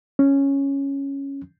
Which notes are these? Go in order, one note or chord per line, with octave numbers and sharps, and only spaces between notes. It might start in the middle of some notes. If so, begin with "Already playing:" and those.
C#4